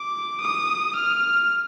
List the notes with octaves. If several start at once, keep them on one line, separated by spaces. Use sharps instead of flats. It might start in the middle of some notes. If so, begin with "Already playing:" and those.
Already playing: D6
D#6
F6